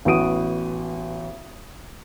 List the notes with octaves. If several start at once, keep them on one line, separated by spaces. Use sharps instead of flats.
A1 B3 F#4 D#6 D7 D#7